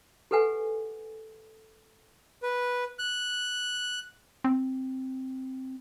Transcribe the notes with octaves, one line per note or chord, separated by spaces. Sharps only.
G4 A4 B4 F#5 G#5
B4
F#6
C4